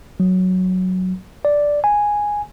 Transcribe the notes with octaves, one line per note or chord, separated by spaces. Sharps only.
F#3
D5
G#5